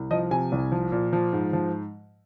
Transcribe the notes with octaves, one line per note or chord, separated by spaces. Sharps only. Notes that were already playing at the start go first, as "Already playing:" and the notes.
Already playing: C2
F3 D#5
C3 G#5
C2
F3
A#2
F3
G#2
F3